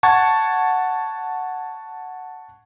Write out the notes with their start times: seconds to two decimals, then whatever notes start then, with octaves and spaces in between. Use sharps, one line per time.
0.03 F#5 A5 C#6 G#6